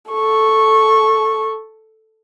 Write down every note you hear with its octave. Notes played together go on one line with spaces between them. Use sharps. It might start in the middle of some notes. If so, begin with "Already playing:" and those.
A4 C#6